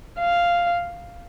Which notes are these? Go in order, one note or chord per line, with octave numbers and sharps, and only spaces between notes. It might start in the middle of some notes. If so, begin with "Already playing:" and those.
F5